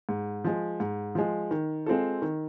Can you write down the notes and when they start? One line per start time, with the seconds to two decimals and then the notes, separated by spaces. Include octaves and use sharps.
0.09 G#2
0.44 F3 G#3
0.80 G#2
1.15 F3 G#3
1.51 D#3
1.86 G#3 C4 F4 A4
2.22 D#3